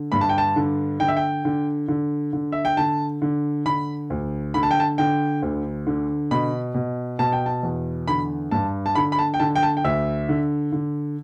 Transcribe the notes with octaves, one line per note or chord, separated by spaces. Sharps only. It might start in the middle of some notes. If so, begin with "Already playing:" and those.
Already playing: D3
G2 B5
A5
G5
A5
D3
D3 G5
E5
G5
D3
D3
D3
E5
G5
D3 A5
D3
D3 B5
D2
D3 B5
A5
G5
A5
D3 G5
D2
D3
B2 B5
B2
B2 A5
G5
A5
E2
D3 B5
G2 A5
A5
D3 B5
B5
A5
G5
D3 A5
G5
A5
G5
D2 E5
D3
D3